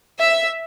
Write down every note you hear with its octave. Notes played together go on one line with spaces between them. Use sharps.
E5